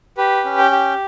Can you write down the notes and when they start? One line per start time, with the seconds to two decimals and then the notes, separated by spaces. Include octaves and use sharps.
0.17 G4 B4
0.45 C#4
0.58 G5
0.71 G4